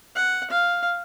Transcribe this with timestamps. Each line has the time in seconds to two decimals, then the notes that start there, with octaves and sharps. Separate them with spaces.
0.15 F#5
0.50 F5